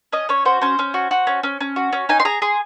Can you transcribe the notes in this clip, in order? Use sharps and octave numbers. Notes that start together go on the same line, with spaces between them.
C#4 D#5
C#4 C#5
F#4 C5
C#4 C5
C#4
F#4
F#4
C#4
C#4
C#4
F#4
C#4
D#4 G#5
C6
G#4 A#5
G#4 C6